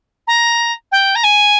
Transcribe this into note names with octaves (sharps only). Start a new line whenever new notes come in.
A#5
G5
A#5
G#5